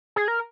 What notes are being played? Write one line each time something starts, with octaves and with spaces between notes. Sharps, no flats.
G#4
A#4